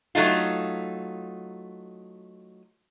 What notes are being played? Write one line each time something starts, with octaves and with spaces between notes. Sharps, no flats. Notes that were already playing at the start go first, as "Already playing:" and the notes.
F#3 A3 D#4 F4